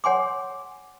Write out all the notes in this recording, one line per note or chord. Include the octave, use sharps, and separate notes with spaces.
C#5 F#5 G#5 C6 D6